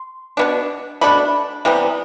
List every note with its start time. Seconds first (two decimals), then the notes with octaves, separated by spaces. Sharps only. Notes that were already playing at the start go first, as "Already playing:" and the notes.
Already playing: C6
0.37 B2 G3 B3 D4
1.01 B2 A3 D4 B5
1.65 C3 E3 G3 B3